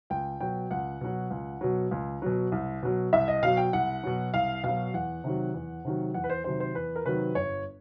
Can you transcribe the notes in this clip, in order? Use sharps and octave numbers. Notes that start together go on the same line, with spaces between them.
C#2 G5
B2 F#3 G5
C#2 F#5
B2 F#3
C#2
B2 F#3
C#2
B2 F#3
C2
B2 F#3
C2 E5
D#5
B2 F#3 F5
G5
C2 F#5
B2 F#3
C2 F5
B2 F#3 F5
E2 F#5
C3 D#3 F#3
E2
C3 D#3 F#3
E2 F#5
B4
C5
C3 D#3 F#3 C5
C5
E2 B4
A#4
C3 D#3 F#3 B4
G1 C#5